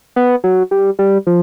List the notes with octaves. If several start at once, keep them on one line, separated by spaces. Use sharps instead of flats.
B3
F#3
G3
G3
F3